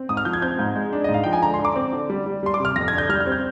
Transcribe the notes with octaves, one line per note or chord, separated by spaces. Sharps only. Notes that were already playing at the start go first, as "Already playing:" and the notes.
Already playing: C4
G#2 D#6
F6
F3 G6
G#6
C4 G6
G#2
G#3
D4
G#2 D#5
F5
F3 G5
G#5
D3 A#5
C6
D3
D6
C4
D3
G3
G3
G3 C6
D6
C3 F6
F2 A#6
D3 G#6
G6
G3 F6
F6
C4
G6